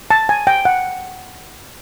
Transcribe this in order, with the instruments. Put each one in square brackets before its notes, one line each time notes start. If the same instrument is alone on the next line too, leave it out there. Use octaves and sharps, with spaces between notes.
[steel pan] A5
G#5
G5
F#5